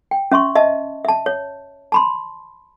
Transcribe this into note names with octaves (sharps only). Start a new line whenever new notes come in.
G5
C#4 E5 C6 C#6
D#5 E5 A5
E5 A5
C#5
A5 B5 C6